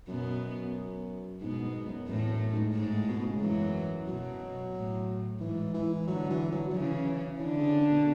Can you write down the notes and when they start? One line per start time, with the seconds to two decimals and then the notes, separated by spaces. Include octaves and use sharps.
0.08 F#2 B2 B3
1.41 G#2 B2 B3
1.64 G#2
1.87 F#2
2.08 E2 A2 A3
2.26 E2
2.30 F#2
2.53 G#2
2.75 G#2 G#3
2.92 A2
3.09 B2
3.20 B2
3.25 C#3
3.41 F#2 E3 F#3
4.08 B2 F#3
4.74 A2
5.40 G#2 E3
5.74 E3
6.07 D3 F#3
6.30 E3
6.52 F#3
6.68 F#3
6.74 C#3 E3 C#4
7.40 D3 E3 D4
7.58 C#3
7.74 C#3
7.91 B2